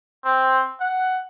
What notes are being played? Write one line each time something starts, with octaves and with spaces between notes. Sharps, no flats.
C4
F#5